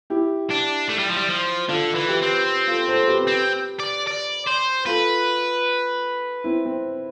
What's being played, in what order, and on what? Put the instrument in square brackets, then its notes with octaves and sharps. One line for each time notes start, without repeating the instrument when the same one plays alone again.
[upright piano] E4 G4
[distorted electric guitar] D4
A3
G3
F3
G3
F3
[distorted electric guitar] D3 [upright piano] F4 A4
[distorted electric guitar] E3
[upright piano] G4 B4
[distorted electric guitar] C4
[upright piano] F4 A4
A4 C5
G4 B4
[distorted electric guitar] C4
D5
D5
C5
[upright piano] F4 A4 [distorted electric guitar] B4
[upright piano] C4 E4
C4